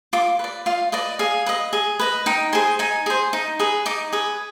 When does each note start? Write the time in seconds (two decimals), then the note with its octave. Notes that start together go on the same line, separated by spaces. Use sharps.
0.13 F4 D6
0.39 B4 D5
0.66 F4 F5
0.92 B4 D5 D#5
1.19 G#4 F5
1.46 B4 D#5
1.73 G#4
1.99 B4 D#5
2.26 D#4 G5
2.53 G#4 C5 G#5
2.79 D#4 G#5
3.06 G#4 C5
3.33 D#4
3.59 G#4 B4
3.86 D#4 D6
4.13 G#4 B4